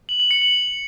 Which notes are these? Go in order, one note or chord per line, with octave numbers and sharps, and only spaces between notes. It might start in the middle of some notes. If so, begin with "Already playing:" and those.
F#7
F#7
C#7
F#7